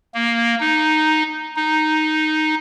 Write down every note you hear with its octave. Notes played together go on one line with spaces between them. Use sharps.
A#3
D#4
D#4